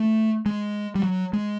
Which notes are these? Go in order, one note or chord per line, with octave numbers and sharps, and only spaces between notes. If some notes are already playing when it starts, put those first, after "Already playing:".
Already playing: A3
G#3
G3
F#3
G#3